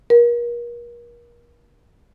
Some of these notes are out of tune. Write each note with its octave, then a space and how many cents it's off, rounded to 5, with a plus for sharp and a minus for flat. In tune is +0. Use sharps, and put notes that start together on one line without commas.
A#4 +35